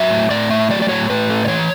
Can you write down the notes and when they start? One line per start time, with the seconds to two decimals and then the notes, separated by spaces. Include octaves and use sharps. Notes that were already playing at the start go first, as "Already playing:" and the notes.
Already playing: F#3 E5
0.10 A2
0.30 A2 D5
0.50 A3 E5
0.70 F#3 D5
0.82 D5
0.89 A2 C#5
1.10 A2 B4
1.30 A3
1.45 D5
1.48 E3 C#5